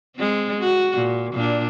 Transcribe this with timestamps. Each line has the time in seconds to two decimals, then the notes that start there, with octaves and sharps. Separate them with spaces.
0.17 G#3 C4
0.59 F#4
0.95 A#2
1.34 A#2 D4